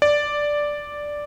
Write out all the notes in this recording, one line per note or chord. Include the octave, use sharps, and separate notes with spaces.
D5